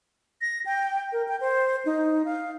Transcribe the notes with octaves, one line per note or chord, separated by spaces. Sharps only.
A#6
G5
A#4
G5
C5
D#4
F5